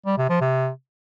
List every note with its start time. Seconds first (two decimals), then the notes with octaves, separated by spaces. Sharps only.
0.06 G3
0.18 C3
0.29 F3
0.41 C3